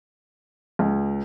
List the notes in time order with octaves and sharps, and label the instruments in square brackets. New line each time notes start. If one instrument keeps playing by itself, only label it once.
[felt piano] C#2